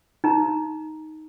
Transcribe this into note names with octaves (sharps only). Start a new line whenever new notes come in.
D#4 A#5